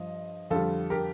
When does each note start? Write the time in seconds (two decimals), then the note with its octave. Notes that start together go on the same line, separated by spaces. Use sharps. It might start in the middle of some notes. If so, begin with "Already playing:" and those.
Already playing: G2 F3 D#5
0.50 F2 D3 G3 F4 A4
0.90 G4 A#4